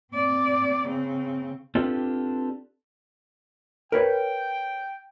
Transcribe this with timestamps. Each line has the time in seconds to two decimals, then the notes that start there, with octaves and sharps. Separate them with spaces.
0.13 C4 D5
0.87 C#3 C4
1.75 C4 D4 F4 G4 A4 B4
3.92 A#4 B4 C#5 G5